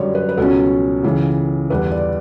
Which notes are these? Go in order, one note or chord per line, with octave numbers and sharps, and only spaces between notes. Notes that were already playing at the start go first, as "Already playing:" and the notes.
Already playing: F#2 D3 G3 C#5 D5
B4
B4
C#2 B2 F#3 C#4 A4
C#2 C#3 E3
E2 D3 G3 B4
D5